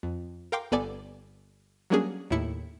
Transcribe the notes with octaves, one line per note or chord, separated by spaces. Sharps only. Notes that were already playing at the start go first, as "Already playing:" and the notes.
F2
A#4 F5 G5 C6 D6
G1 B3 A4 D5 G#5 D6
F#3 G3 A#3 C#4 D4 G#4
D#2 A2 E4 C#7